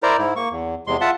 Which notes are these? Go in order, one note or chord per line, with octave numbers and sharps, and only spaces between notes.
E4 A#4 C5 D5 A#5
G#2 E4
A#3 C#6
E2
E2 C3 G#3 C6
F4 E5 F#5 A5